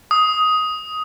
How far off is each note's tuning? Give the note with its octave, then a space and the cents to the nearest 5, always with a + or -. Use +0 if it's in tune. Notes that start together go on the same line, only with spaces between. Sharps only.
D#6 +10